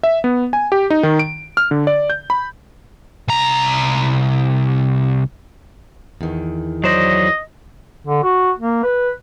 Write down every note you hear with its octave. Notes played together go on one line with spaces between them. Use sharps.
E5
B3
G#5
G4
D#4
D#3
D7
F6
D3
D5
G6
B5
C2 A#5
E2 D#3
F#3 C5 D5 D#5
D3
F#4
A#3
B4